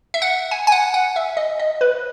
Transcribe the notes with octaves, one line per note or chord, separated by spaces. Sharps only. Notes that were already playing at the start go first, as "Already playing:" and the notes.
E5
F#5
G#5
G#5
F#5
F#5
E5
D#5
D#5
B4